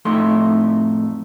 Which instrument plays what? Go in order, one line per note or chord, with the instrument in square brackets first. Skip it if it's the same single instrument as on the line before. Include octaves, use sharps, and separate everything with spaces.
[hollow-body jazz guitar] F2 A2 A3 D#4 C6